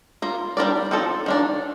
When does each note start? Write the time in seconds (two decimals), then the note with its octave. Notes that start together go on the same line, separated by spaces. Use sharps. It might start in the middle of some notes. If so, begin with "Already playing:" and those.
0.22 A#3 F4 A#4
0.57 G3 D4 F4 A#4 D5
0.91 F3 C4 D#4 A4
1.26 D#3 A#3 D4